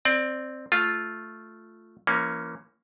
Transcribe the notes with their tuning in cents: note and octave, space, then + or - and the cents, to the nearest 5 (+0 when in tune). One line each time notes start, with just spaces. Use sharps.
C4 +0 D5 +20
A3 +0 F4 +0
E3 +35 A#3 +0 C#4 +0